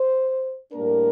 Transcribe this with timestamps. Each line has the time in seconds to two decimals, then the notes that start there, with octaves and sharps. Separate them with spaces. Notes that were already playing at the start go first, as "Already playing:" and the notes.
Already playing: C5
0.72 A2 G3 A#3 D4 A#4